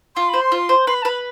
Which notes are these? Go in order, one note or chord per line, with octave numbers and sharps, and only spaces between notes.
F4 C6
C5 B5
C6
F4
C5
B4 C6
B5
A5
B4 B5